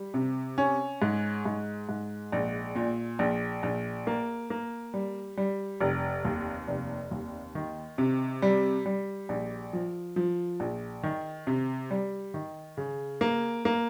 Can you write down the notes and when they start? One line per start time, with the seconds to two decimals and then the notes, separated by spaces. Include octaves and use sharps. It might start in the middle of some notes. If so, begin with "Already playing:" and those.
Already playing: G3
0.14 C3
0.58 C#4
1.02 G#2
1.45 G#2
1.89 G#2
2.32 A#1
2.76 A#2
3.19 A#1
3.63 A#1
4.07 A#3
4.50 A#3
4.94 G3
5.37 G3
5.80 F1
6.25 D#2
6.67 F1
7.11 D#2
7.55 D#3
7.98 C3
8.42 G3
8.86 G3
9.29 A#1
9.73 F3
10.16 F3
10.60 A#1
11.03 D#3
11.47 C3
11.91 G3
12.34 D#3
12.77 C#3
13.21 A#3
13.65 A#3